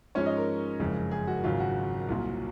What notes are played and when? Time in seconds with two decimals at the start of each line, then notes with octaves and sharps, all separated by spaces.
0.15 G#2 F3 G#3 C#4 C#5
0.26 D#5
0.37 A#4
0.79 F#1 F2 C#3 G#3
1.11 G#4
1.27 F#4
1.44 G#1 F#2 C#3 F#3 F4
1.60 F#4
2.08 C2 A#2 F#3